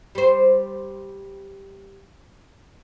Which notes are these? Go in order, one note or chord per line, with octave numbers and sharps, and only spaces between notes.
G3 C5